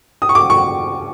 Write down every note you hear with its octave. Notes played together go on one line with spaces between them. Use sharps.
D#6
C#6
D6
C#6